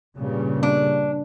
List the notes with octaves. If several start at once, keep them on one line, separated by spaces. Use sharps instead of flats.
G2 A#2 C#3
D4